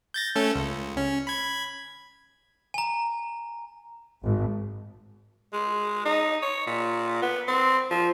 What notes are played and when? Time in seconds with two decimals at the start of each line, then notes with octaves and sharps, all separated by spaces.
0.14 G6 A6 A#6
0.36 A3 C#4 A4
0.56 C#2
0.97 C#4
1.27 B5 G#6
2.74 G#5 A#5
4.22 G#1
5.53 G#3
6.05 D#4
6.42 C#5
6.67 A#2
7.22 B3
7.48 C4
7.91 F3